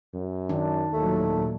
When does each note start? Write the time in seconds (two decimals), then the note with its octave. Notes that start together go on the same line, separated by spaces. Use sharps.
0.14 F#2
0.49 D#3 D4
0.93 D#2 A#2 F#3 A3